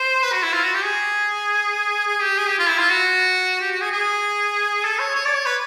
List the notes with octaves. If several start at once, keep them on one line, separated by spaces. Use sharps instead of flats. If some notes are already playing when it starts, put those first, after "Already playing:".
Already playing: C5
B4
F#4
E4
F4
F#4
G4
G#4
G#4
G4
G#4
G4
F4
E4
F4
F#4
G4
F#4
G#4
G#4
A4
C#5
C#5
D5
C#5
B4